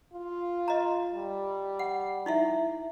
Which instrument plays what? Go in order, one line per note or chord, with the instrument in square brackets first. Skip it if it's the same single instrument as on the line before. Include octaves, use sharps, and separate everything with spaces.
[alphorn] F4
[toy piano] D#5 A#5
[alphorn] G3
[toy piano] F#5
D#4 E4 E5